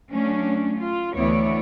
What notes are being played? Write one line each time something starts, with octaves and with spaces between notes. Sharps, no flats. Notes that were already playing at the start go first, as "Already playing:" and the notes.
F#3 A3 C#4 D4
F4
D2 E3 B3 E4 C#5 D5